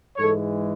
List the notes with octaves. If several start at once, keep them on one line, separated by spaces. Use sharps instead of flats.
G#2 E3 G#3 A4 C#5